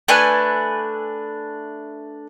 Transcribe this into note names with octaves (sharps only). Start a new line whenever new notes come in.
A3 D4 B4 G#5